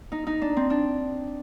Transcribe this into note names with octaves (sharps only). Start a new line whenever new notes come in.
D#4
D#4
D4
C4
D4